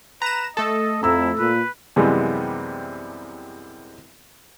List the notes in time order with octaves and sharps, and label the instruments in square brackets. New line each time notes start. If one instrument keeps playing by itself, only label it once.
[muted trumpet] B4 [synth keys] A#5 E7
[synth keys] A3 A4 [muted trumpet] D#5
[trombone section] F2 [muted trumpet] E4 [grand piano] A#5 E6
[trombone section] A#2 [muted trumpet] B4
[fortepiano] F#2 C3 E3 G3 G#3 B3